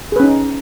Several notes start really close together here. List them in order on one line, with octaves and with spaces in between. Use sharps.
G#4 B4 C#4 D#4